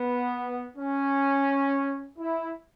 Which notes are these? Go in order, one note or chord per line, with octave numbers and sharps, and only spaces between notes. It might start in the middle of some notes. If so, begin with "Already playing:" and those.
Already playing: B3
C#4
E4